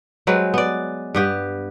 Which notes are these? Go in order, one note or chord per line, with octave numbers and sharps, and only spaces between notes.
F#3 G#3 C4 B4
B3 D5
G2 B3 G4